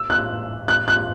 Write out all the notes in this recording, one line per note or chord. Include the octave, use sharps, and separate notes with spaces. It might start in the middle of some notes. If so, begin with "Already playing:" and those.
Already playing: E6
F#6
F#6
F#6